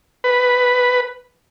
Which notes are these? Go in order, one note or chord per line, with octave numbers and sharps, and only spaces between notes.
B4